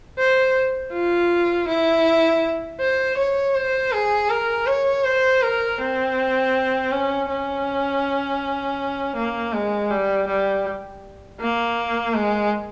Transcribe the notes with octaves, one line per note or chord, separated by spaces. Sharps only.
C5
F4
E4
C5
C#5
C5
G#4
A#4
C#5
C5
A#4
C4
C#4
C#4
A#3
G#3
G3
G3
A#3
G#3